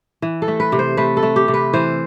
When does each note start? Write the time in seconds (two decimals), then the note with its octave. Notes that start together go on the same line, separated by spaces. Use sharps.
0.22 E3
0.42 A4
0.48 A3
0.60 B4
0.72 C3
0.79 C5
0.97 A3 B4
1.17 A4
1.23 A3
1.36 G4
1.48 C3
1.54 B4
1.74 E3 C5